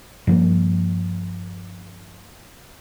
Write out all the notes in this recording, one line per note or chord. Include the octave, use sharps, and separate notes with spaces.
G2 F3 A#3